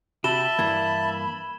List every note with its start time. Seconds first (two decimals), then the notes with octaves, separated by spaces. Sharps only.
0.24 C3 F#4 G4 E5 A5 B5 E7 G7
0.59 G2 E3 A#3 G#6